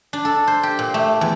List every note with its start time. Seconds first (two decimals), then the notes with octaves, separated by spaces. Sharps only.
0.13 D4
0.25 A4
0.47 C5
0.63 G4
0.79 A#2
0.94 A3
1.21 E2